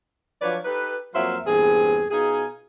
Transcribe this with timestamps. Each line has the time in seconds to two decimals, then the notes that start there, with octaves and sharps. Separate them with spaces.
0.42 F3 F#3 D4 B4 C#5 D5
0.64 D#4 G4 A4 B4
1.14 F2 F#3 A#3 C5 E5 F5
1.46 E2 G2 A#2 C4 G#4
2.10 B2 D#4 F4 G#4